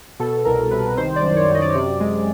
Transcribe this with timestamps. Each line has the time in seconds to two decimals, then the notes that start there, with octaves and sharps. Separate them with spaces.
0.19 B2 A4
0.45 C2 A#4
0.71 C2 B4
0.97 D#3 C5
1.16 D5
1.22 F#2
1.37 C#5
1.49 F#2
1.55 D#5
1.62 D5
1.70 C#5
1.75 C3 D5
2.00 G#3